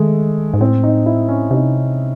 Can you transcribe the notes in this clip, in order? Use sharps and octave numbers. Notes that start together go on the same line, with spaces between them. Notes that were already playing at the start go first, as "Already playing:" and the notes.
Already playing: D#3 G#3 A3
G#2
A2 C4
D#4
E4
C#4
C3 D#4